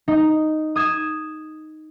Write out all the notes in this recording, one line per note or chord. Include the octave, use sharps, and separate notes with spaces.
D#4
D#6 G#6 E7